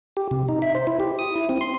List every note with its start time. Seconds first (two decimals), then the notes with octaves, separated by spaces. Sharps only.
0.17 G4
0.31 C3
0.49 D#4
0.62 E5
0.75 C5
0.87 E4
1.00 G4
1.19 D#6
1.36 E4
1.49 C4
1.61 C6